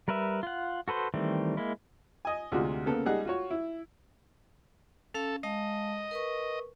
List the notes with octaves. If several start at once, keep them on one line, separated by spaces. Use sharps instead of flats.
G3 A#4 B4 E5
F4 F#5
F#4 A4 B4 C5
D#3 E3 G3 A3 C4
G#3 A#3 E4
D#5 G#5
D2 C3 G#3 F4 F#4
C#3 A#3 B3 A4
G3 G#3 D#4 G#4 F#5
F4 F#4 C#5
E4
C#4 A4 F5
G#3 D#5 F5 A5
A#4 B4 C#6